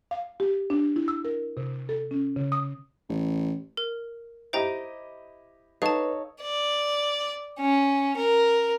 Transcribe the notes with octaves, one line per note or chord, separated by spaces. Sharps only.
F5
G4
D4
E4
E6
A#4
C3
A4
C#4
C#3
D#6
A1
A#4
E4 G4 C5 D#5 G5 A#5
D#4 A4 B4 C#5 F5 A5
D5
C#4
A#4